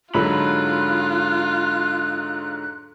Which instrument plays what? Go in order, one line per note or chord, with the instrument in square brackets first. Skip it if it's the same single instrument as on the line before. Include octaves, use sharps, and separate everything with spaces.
[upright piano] G#2 D3 F#3 [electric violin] F4 [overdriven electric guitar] B5 [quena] F#6